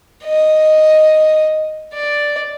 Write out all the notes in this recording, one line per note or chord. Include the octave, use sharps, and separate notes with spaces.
D#5
D5